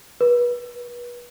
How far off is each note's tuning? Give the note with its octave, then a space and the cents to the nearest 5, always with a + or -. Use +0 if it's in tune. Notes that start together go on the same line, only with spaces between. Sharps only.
B4 -30